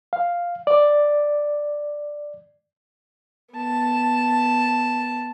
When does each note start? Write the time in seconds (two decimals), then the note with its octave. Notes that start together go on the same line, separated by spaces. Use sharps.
0.13 F5
0.67 D5
3.53 B3 A5